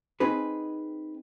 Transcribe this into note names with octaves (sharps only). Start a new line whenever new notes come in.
C4 D#4 G#4 B4